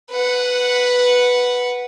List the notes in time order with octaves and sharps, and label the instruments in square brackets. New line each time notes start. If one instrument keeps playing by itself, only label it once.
[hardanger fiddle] B4 F#5